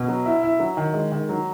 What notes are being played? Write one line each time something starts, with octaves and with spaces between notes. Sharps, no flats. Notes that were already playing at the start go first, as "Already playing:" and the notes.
Already playing: B2
F#3
E4
E4
F#3
D#3
G#3
D#3
F#3